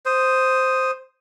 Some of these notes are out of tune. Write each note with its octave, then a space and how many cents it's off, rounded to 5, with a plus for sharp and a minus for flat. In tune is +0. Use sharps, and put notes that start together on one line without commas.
C5 +0 D#6 +0